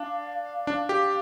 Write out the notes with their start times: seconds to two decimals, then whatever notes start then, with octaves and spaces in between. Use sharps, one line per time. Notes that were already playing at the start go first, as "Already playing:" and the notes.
Already playing: D4 F5
0.67 D4
0.89 G4